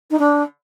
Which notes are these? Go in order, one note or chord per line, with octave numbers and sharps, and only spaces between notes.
D#4
D4